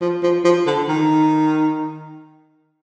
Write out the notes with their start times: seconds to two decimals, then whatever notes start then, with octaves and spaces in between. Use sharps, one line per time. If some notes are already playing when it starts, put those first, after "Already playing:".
0.02 F3
0.23 F3
0.45 F3
0.67 D3
0.89 D#3